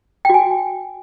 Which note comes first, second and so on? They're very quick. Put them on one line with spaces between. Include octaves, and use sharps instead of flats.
G5 F#4 G#5